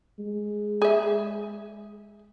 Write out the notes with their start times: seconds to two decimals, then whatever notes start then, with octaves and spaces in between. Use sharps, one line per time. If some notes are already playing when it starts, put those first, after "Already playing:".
0.19 G#3
0.82 G#4 E5